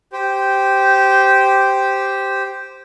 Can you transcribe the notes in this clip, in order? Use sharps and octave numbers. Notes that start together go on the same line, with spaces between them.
G4 C5